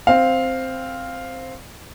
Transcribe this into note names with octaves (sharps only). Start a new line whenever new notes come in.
C4 F5